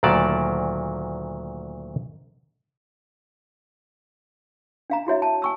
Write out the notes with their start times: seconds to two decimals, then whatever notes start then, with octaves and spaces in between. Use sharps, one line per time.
0.03 D2 A#2 D#3 F#3 D5 A5
4.90 D4 F5 A#5
5.07 E4 F#4 C#5 E5
5.22 A5
5.42 G#5 C#6 E6